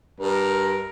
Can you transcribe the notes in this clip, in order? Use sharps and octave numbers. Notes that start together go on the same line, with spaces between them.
G2 A#4